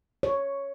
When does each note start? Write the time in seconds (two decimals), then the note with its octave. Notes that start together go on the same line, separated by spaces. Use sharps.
0.23 C#5